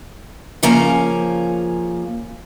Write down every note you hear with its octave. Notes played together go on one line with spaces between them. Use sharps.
C#3 F3 A#3 C#4 G#5 A#5